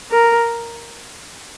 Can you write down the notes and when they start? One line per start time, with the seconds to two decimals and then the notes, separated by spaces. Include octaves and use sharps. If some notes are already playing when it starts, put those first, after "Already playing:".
0.12 A#4